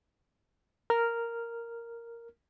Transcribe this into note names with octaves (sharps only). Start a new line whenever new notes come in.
A#4 F6